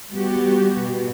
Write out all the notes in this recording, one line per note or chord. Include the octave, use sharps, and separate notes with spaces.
G3 B3 F#4 G4
B2